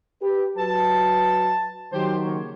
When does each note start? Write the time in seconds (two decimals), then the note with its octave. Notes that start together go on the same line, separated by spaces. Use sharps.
0.22 G4 B4
0.57 F#3 F#4 B4 A5
1.93 D#3 F#3 G4 C5
2.23 C#3 A#3 C#5